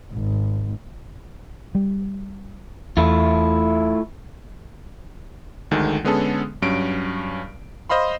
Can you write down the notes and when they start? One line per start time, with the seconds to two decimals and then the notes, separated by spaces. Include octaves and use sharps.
0.13 G#1
1.75 G3
2.97 E2 A3 E4 F4
5.71 D2 D3 D#3 G#3
6.04 D3 G#3 B3 C#4 G#4 A4
6.62 G2 F#3 C#4 D7
7.89 C5 D#5 F5 B5 C6